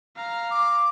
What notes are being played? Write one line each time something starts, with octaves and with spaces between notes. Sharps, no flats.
F5 A#5
D6